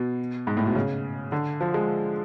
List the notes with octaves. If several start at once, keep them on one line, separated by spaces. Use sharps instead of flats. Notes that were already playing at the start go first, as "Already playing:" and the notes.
Already playing: B2
G#2
A2
B2
C#3
D3
F3
G#3